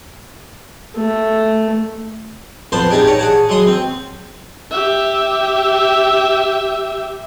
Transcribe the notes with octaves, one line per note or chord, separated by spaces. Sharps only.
A3
F2 B3 C5 A5 C6
D4 D#4 G4 G#4 D5
C#5 D5 A#5
G#4 F#5 A5
F#3 G#3 C6 D#6
C4
G4 E5